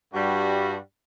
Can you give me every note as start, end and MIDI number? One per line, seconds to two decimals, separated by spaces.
0.13 0.75 43
0.13 0.75 55
0.13 0.75 66